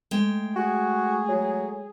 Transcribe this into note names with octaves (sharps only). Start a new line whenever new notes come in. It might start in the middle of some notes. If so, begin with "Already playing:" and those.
G#3 A3 G5
F#4 G#4
F#3